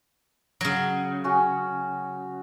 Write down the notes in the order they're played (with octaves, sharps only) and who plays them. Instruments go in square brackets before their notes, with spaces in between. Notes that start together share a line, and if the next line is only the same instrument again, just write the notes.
[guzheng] C#3 F#3
[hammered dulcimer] C#4 F#4